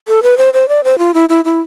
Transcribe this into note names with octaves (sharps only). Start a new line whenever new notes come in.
A4
B4
C5
C5
D5
C5
F4
E4
E4
E4